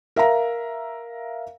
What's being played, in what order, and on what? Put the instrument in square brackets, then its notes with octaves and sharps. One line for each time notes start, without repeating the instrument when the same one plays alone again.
[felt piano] A#4 E5 F5 A#5